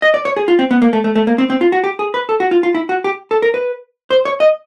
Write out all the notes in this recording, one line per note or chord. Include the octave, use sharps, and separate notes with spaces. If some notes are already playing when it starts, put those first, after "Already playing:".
D#5
D5
C#5
G#4
F4
C4
B3
A#3
A3
A3
A3
A#3
C4
C4
F4
F#4
G4
G#4
B4
A4
F#4
F4
F4
E4
F#4
G4
A4
A#4
B4
C5
C#5
D#5